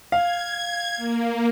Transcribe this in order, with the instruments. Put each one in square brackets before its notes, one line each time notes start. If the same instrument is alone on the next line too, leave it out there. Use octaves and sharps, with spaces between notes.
[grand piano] F5 [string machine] G#6
[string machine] A#3